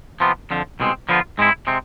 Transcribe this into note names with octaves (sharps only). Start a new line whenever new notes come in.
C3 F3 B3 F4
F2 D3 F3
C2 B2 G#3 C4
D3 F3 B3 F4
G#2 G#3 C4 E4
C3 G#3 C4